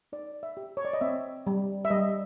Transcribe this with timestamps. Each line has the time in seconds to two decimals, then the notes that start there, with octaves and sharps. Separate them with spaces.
0.13 D#4 D5
0.43 E5
0.57 G4
0.77 C#5
0.85 D5
0.93 D#5
1.01 C4 E5
1.47 G3
1.85 E5
1.90 G3 D#5